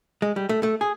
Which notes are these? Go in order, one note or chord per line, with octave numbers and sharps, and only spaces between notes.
G#3
G3
A3
A3
G#4